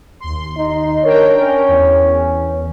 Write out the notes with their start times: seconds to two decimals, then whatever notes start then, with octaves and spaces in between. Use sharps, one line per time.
0.20 D#2 C6
0.57 D#4
1.03 D4 A#4 C#5 G5
1.40 C#4
1.68 E2